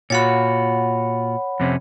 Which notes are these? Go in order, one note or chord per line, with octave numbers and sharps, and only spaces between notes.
A#2 F4 F#4 C#5 F#5 B5
F2 C3 C#4